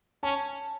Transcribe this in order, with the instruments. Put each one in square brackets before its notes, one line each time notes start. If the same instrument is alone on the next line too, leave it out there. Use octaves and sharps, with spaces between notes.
[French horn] C#4 [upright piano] A5